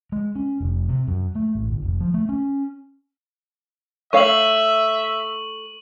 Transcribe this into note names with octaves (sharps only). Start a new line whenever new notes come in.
G#3
C#4
F1
C3
F#2
A3
A1
G1
F1
F3
A3
C#4
A3 C#5 E5 F5 C#6 F#7